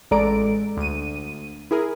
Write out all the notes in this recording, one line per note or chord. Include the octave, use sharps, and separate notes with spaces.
A1 G#3 A4 D5 A#5 D7
D2 D#7
E4 G#4 A#4